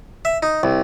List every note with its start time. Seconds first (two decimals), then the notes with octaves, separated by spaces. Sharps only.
0.25 E5
0.43 D#4
0.63 C2